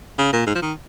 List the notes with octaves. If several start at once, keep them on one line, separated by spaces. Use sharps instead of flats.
C#3
A#2
G#2
F3
D#3